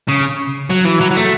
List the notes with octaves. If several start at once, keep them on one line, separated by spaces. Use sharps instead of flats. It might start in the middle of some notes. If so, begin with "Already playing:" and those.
C#3
F#3
E3
F#3
F#3
A3